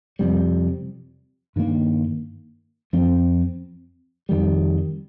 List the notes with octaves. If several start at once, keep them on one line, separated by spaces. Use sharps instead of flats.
F2 C3 G3
G2 D#3 A#3
F2 F3 C4
F2 D#3 G3